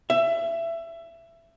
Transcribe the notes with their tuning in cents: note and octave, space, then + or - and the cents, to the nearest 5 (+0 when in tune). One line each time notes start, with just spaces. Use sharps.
E5 +20